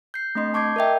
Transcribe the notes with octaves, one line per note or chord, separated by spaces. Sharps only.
G6 C7
A3 C4 D4 D#5 C6 C7
A5 C#6 D6 G6 G#6 C7
A#4 D#5 E5 G5